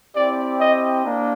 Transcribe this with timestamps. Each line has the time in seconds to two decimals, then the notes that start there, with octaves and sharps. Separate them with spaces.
0.15 C4 E4 G4 D5
0.60 D#5
1.04 A#3 D4